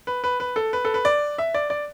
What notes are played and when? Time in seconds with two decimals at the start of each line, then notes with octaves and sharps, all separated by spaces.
0.07 B4
0.24 B4
0.40 B4
0.56 A4
0.73 B4
0.85 A4
0.94 B4
1.05 D5
1.38 E5
1.54 D5
1.70 D5